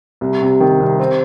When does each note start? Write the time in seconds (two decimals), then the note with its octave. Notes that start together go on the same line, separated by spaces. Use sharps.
0.21 C2
0.41 C3
0.61 D#3
0.80 C2
0.99 C4